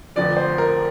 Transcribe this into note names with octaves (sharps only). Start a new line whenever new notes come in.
F1 F2 D3 F3 D5
C5
A#4